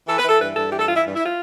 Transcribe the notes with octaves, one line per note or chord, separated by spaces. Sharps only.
E3 A4
B4
E3
A4
G2 B4
G2 A4
E3 G4
A4
E3 F4
E4
G2
E4
F4